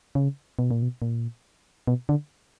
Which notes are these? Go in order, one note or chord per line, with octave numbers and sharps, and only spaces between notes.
C#3
B2
A#2
B2
A#2
B2
D3